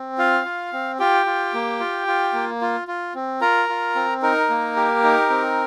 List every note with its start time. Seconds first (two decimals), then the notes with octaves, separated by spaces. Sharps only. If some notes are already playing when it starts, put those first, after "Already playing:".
Already playing: C4
0.18 F4 F5
0.45 F4
0.73 C4
0.99 F4 G4 G5
1.26 F4
1.54 A#3
1.80 F4
2.07 F4
2.33 A#3
2.61 F4
2.88 F4
3.15 C4
3.41 F4 A#4 A#5
3.69 F4
3.95 C4
4.22 D#4 A#4
4.49 A#3
4.76 G4
5.03 D#4
5.30 C4